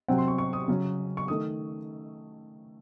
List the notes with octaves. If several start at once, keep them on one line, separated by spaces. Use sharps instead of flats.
C3 F#3 C4 F#5
C6
C#6
C#6
D#6
C#3 F#3 C#4
C#6
D#3 A3 D#6